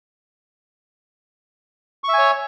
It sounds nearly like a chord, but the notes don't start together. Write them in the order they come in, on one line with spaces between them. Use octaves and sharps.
C#6 E5 G#5 C#5